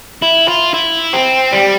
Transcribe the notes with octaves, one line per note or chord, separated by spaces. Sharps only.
E4
F4
E4
C4
G3